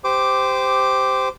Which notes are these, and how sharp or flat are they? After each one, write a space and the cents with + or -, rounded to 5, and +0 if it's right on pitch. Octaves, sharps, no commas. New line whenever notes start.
G4 +0 C5 -15 D6 +0